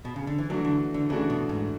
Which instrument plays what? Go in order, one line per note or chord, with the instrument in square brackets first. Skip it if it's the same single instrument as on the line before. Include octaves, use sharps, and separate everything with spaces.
[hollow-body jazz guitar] B2
C#3
D3
E3
[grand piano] E3 A3 D4 F#4 [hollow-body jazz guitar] F#3
[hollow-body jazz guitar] D3
D3
[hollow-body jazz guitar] C#3 [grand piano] E3 A3 D4 F#4
[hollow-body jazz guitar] B2
G#2